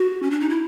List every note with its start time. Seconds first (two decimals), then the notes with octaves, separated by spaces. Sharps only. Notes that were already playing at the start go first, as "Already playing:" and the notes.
Already playing: F#4
0.23 C#4
0.31 D4
0.40 D#4
0.49 E4